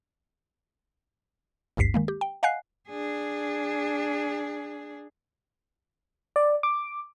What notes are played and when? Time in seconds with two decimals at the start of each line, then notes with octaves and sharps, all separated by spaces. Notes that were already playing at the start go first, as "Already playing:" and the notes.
1.77 G#1 D2 G2 B6 C7
1.94 D#3 G#3 A#3
2.08 G4
2.21 G5
2.43 D#5 F5 F#5 G#5 F#6 C7
2.89 D4 G#4
6.36 D5
6.63 D6